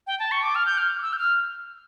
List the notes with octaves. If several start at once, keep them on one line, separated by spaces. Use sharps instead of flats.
G5
A5
C#6
D6
F6
G6
F6
D6
E6
G6
F6